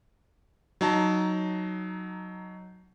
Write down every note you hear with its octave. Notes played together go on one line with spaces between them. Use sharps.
F#3 D#4 A5